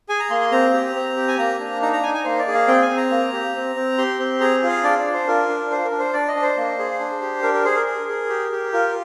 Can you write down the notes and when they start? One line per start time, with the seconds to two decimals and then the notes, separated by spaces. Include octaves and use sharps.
0.09 G#4 G#5
0.20 A#5
0.30 A#3 C6
0.41 C6
0.52 C4 A#5
0.74 G4
0.95 C4
1.17 G4
1.28 G#5
1.38 A#3 A#5
1.60 D4
1.81 D#4 A#5
1.93 A#5
2.03 D#4 G#5
2.14 G#5
2.24 A#3 C5
2.39 D5
2.47 G#4
2.54 F5
2.67 C4 G5
2.82 G#5
2.89 C4
2.97 A#5
3.11 A#3
3.33 G4
3.55 C4
3.76 C4
3.98 G4 C6
4.19 C4
4.40 G#4 A#5
4.63 F4
4.69 F5
4.84 D4 D5
4.98 D5
5.05 D4
5.13 C5
5.27 F4 A#4
5.49 D4
5.71 D4 C5
5.85 A#4
5.92 D4
5.99 C5
6.13 D4 D5
6.28 D#5
6.36 D4
6.42 C5
6.57 A#3
6.79 G#4
7.00 D4
7.21 G4
7.43 D4 A#4
7.54 A#4
7.65 G#4 C5
7.76 A#4
7.86 G#4
8.09 G#4
8.29 G4
8.52 G4
8.72 F4 A#4